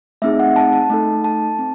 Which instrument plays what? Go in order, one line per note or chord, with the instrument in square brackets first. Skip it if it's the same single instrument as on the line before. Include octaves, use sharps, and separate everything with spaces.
[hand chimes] A3 C4 D#4 G#4 E5
F#5
A5
A5
A3 D#4 A4
A5
C4